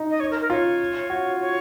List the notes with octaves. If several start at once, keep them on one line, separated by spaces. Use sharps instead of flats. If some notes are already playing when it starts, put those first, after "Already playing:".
Already playing: D#4
D#5
C#5
A#4
A#4
F4 C#5
F#4
C#5